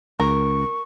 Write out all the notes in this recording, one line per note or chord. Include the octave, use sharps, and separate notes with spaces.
C#2 A#4 C#6